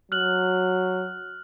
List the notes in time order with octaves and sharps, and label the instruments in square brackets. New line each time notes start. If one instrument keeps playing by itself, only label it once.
[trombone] F#3 [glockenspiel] F6 F#6 F#7